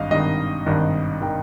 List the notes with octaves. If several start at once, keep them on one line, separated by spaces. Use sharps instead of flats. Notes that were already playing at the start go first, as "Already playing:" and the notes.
Already playing: G#1 G2 D#5 F5
G#1 G2 D#3 D#5
G#1 G2 D#3
D#3 G5